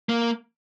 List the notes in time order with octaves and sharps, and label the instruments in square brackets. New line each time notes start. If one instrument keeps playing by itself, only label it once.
[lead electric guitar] A#3